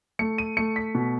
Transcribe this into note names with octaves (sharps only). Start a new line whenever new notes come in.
A3 C#7
D#7
A3 C#7
B6
B2